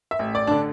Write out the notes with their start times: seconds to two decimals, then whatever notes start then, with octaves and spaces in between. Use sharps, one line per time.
0.11 E5
0.19 A1
0.35 D5
0.47 D3 D4